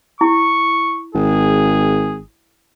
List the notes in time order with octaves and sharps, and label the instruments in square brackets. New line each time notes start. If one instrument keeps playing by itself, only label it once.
[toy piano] E4 [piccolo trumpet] C#6
[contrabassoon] G#1 [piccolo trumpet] G#4